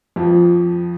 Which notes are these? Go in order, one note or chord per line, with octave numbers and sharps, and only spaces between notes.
F2 F3